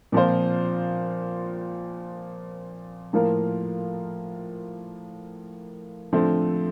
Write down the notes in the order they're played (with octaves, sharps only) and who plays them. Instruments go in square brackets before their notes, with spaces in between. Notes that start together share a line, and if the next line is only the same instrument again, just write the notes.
[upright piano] A#2 F3 C4 F4 C5
A2 F3 A#3 F4 A#4
D3 F3 A3 C4